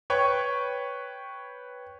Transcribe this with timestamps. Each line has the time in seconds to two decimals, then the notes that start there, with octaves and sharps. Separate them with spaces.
0.10 B4 C#5 G5 C#6